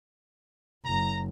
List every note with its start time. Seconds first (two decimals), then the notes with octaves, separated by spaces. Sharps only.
0.86 F#1 A#5